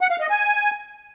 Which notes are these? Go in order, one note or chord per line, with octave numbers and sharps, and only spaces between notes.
F#5
F5
D#5
G#5